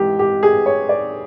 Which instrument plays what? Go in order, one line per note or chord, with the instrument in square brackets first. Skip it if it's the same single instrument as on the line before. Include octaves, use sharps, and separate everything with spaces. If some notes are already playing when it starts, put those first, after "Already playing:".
Already playing: [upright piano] G#2 E3 G4
G4
G#4
C#5
D5